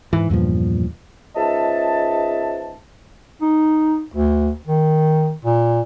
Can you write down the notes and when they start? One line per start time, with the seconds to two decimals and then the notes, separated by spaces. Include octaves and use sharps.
0.13 G#2 E3
0.30 E2 G2 A#2 F3
1.35 C#2 G#2 D#5 E5 A5
3.42 D#4
4.14 D2
4.67 D#3
5.45 A#2